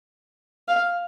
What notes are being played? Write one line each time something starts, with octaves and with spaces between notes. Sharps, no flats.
F5